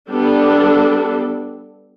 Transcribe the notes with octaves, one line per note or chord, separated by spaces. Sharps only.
G3 B3 D4 A4